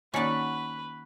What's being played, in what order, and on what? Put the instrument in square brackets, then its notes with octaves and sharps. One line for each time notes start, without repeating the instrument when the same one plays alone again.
[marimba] D#3 A#3 D#4 [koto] C#4 D5 [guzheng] F#4 A5 [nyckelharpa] B4